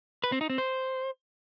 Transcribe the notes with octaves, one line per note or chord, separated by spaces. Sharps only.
B4
C4
D#4
C4
C5